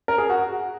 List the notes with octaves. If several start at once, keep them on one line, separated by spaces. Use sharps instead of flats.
A#4
G#4
F#4